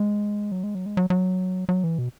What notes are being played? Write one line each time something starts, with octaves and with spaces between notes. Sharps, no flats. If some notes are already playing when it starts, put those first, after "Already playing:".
Already playing: G#3
F#3
G#3
F#3
G#3
F#3
F#3
F#3
E3
B2